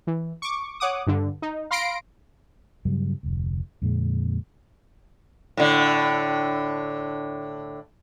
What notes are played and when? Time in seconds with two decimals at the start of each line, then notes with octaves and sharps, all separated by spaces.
0.07 E3
0.42 C#6 D6
0.80 C#5 F#5 D6 D#6
1.07 G2 D3
1.42 D#4
1.71 F5 B5 C6 A#6 C7 D7
2.85 G2 C#3 F#3 G3
3.23 F1 D2
3.82 F2 A#2 D3 G#3
5.57 A2 D3